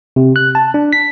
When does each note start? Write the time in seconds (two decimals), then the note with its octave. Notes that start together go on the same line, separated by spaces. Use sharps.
0.16 C3
0.36 F#6
0.55 A5
0.74 D4
0.93 B6